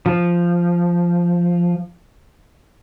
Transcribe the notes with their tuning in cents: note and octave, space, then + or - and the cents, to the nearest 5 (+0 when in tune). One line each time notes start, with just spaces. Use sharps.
F3 -5